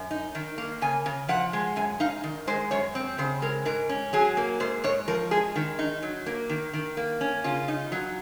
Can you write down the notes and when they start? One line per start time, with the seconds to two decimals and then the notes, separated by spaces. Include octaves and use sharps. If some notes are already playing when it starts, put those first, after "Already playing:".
Already playing: F#2
0.11 D#4
0.35 D#3
0.58 A#3
0.82 C#3 G#5
1.06 C#3
1.29 F3 F#5
1.53 G#3
1.76 F#2 G#5
2.00 D#4 F5
2.24 D#3
2.47 G#3 C5
2.71 F#2 C#5
2.95 C4
3.18 C#3 C5
3.42 G#3 A#4
3.65 G#2 A#4
3.89 C#4
4.13 F#3 G#4
4.37 A#3
4.60 G#2 C5
4.84 G#2 C#5
5.08 F3 A#4
5.31 G#3 G#4
5.56 D#3
5.79 D#4
6.02 F#3
6.26 A#3
6.49 D#3
6.74 D#3
6.97 A#3
7.21 C#4
7.44 C#3 F4
7.68 D#4
7.92 F#3